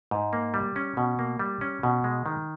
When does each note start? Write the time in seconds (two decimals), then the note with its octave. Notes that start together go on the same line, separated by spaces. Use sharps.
0.11 G#2
0.33 A#3
0.54 G3
0.76 C#4
0.97 B2
1.19 A#3
1.39 G3
1.61 C#4
1.83 B2
2.04 G#3
2.26 D#3